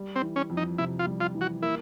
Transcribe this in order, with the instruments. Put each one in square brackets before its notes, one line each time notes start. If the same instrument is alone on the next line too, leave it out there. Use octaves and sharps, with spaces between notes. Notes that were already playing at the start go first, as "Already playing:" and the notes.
Already playing: [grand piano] G3
[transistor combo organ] C4
[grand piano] E3
[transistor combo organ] C#4
[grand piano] F2
[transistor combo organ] D#4
[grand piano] C3 [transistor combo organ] E4
[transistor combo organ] F4
[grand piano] G3
[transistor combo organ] F4
[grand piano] E3
[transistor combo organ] F#4
[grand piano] A#3 [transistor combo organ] E4